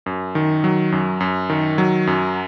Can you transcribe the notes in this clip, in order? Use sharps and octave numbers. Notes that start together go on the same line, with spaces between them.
F#2
D#3
F#3
F#2
F#2
D#3
F#3
F#2